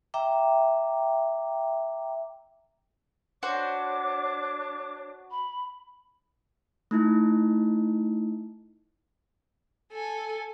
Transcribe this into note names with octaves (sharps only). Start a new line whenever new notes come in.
E5 G5 A#5 D6
D4 F#4 C5 C#5 D6
B5
A3 D#4 E4
A4 G#5